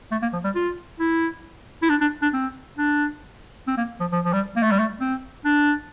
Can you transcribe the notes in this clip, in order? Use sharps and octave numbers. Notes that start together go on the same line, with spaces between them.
A3
A#3
F3
G3
F4
E4
E4
D4
D4
D4
C4
D4
C4
A#3
F3
F3
F3
G3
A#3
A3
G3
A3
C4
D4